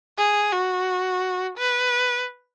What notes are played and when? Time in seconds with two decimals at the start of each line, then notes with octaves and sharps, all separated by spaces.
0.18 G#4
0.53 F#4
1.58 B4